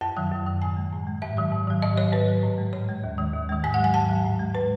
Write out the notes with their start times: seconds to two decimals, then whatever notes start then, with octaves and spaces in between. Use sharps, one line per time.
0.01 F#2 A5
0.17 D#3 F#3
0.31 F#2
0.46 D#3 F#3
0.62 A2 G#5
0.77 G#3
0.92 A2
1.07 G#3
1.22 G#2 E5
1.37 D#3 F#3
1.52 G#2
1.67 D#3 F#3
1.82 G#2 D#5
1.98 F#3 C#5
2.12 G#2 B4
2.28 F#3
2.43 A2
2.58 G#3
2.73 A2 C#5
2.89 G#3
3.04 D#2
3.18 D#3 G#3
3.33 D#2
3.49 D#3 G#3
3.64 G#2 G#5
3.74 F#3 F#5
3.84 G#5
3.94 G#2 A5
4.09 F#3
4.25 A2
4.39 G#3
4.55 A2 B4